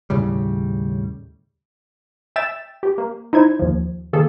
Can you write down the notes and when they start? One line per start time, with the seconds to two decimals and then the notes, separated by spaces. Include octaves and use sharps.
0.10 D#2 A2 C#3 G3
2.36 E5 G5 E6 A6 E7
2.83 G4
2.98 A#3
3.33 D#4 E4 C5 G#6
3.59 D#2 F3
4.13 D#3 A#3 G#4 A4